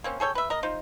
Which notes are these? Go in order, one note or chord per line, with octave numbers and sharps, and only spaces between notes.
A#3 C4 C#4
G#4 A4 C#5 G5
B4 E5
A#4 D#5
D#4 F4 C5